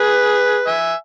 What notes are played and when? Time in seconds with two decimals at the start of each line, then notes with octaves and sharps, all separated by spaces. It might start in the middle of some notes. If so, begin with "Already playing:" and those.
Already playing: G#4 B4
0.67 E5 G#5